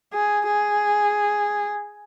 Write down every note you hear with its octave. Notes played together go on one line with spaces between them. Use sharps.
G#4
G#4